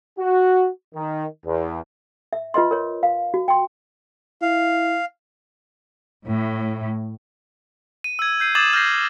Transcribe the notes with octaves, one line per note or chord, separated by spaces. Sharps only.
F#4
D#3
E2
E5
F4 B4 D#5 C6
A#4 C#5
F5
F#4
G5 C6
E4 F5
A2
D#7
E6 G#6
G6 C7 D#7
D6 D#6 G#6 A6 E7 F#7
F6 G6 A#6 C7